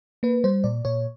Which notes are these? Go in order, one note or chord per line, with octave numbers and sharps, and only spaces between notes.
A#3 B4
G3 C5
A#2 D5
A#2 C#5